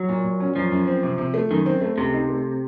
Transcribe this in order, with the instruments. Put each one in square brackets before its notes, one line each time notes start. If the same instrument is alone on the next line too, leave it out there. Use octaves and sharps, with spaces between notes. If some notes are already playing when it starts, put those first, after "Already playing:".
Already playing: [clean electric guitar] F#3
[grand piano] A#2
A#2
C#4
[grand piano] F#2 [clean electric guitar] F3
[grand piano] F#2
C4
C3
C3
A3
[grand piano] F#2 [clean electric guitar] D#3
[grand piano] C4
A3
[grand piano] C#2 [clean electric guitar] C3
[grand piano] D#4
A3